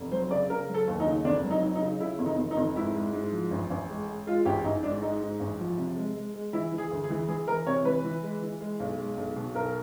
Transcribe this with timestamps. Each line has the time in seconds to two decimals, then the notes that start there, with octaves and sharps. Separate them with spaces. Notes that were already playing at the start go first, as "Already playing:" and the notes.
Already playing: F1
0.12 F#3 C5
0.30 C#3 D5
0.49 C#3 A#4
0.69 F#3
0.74 A4
0.88 D#2
1.00 D#4
1.06 C#3
1.25 F1 D4
1.44 F#3
1.51 D#4
1.62 F#3
1.75 D#4
1.82 C#3
2.00 C#3 E4
2.19 F1
2.26 D#4
2.38 F1
2.51 D#4
2.57 F1
2.76 G#2 E4
2.95 G#3
3.13 G#2
3.32 F3
3.51 A1
3.70 A1
3.90 G#3
4.08 G#3
4.27 G#3 F4
4.45 A1 G4
4.64 A1 D#4
4.83 G#2 D4
5.02 G#3 D#4
5.21 G#2
5.40 A1
5.59 F3
5.78 C3
5.96 G#3
6.15 G#3
6.34 G#3
6.53 E3 E4
6.72 E3
6.78 G#4
6.91 D2
7.04 G#4
7.10 E3
7.28 E3 G#4
7.47 E3 A#4
7.66 C3 C#5
7.85 E3 B4
8.04 E3
8.23 G#3
8.42 E3
8.61 G#3
8.80 B1
8.98 G#3
9.17 B1
9.36 B2
9.55 B1 A#4